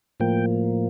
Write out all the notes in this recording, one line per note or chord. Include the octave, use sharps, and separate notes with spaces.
A2 F3 A#3 G5